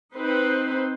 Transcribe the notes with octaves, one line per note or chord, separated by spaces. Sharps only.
C4 D#4 B4 C5